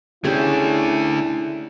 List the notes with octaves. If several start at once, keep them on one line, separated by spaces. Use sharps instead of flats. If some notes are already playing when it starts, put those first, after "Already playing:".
A3 C#4 D4 E4 G4 G#4